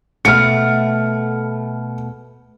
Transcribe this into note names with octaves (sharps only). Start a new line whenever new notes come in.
B2 A3 F6 C#7